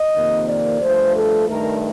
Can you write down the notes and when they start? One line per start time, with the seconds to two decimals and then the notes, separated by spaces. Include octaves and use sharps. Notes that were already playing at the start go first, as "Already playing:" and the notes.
Already playing: D#5
0.15 F2 C3 D#3 A#3
0.48 D5
0.81 G2 F3 A3 C5
1.14 A4
1.48 G2 D#3 A3 A#4